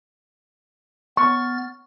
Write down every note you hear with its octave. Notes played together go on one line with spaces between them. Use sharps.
B3 C#6 F6 A6